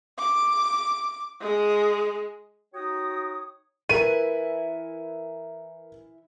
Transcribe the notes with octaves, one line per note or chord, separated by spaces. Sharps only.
D6
G#3
D#4 F#4 C#5 G5 D#6
E3 E4 A#4 B4 D#7